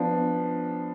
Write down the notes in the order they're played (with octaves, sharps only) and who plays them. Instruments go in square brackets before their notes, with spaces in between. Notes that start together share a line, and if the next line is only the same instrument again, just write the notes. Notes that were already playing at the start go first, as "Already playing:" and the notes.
Already playing: [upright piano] F3 B3 D4